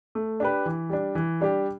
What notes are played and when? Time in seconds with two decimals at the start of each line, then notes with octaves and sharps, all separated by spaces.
0.15 A3
0.40 D4 G4 B4
0.66 E3
0.89 G3 D4
1.15 E3
1.41 G3 D4 G4